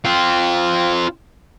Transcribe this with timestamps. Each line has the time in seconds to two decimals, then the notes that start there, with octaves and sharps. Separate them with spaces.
0.05 C4 F4